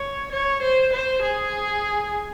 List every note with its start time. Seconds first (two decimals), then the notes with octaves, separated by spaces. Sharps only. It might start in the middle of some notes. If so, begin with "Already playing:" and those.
Already playing: C#5
0.32 C#5
0.62 C5
0.93 C5
1.22 G#4